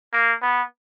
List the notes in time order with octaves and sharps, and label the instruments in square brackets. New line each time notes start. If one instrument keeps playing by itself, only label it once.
[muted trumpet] A#3
B3